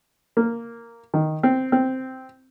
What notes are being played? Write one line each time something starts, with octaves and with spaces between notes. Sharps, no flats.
A#3
D#3
C4
C4